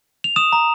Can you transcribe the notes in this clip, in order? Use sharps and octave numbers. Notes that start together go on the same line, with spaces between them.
F7
D#6 E7
A#5